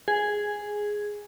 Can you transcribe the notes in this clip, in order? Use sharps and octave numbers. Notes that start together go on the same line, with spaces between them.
G#4